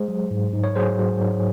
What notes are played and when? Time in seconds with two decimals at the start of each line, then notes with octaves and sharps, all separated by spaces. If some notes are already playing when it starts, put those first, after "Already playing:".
Already playing: G#3 G#4 C5
0.08 F#3
0.31 G#2
0.53 G#2
0.64 C#5
0.75 F#3 G#4 C5
0.99 F#3
1.21 G#2